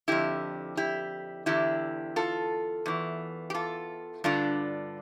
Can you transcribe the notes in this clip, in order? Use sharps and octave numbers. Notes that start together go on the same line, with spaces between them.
F2 D3 E4 G4
E4 G4
E2 D3 E4 G4
F4 A4
E2 E3
G4
F4 A4
G2 D3 D4 F4